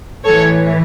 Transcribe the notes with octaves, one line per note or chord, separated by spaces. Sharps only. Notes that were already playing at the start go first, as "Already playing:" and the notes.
A2 E3 A4 C#5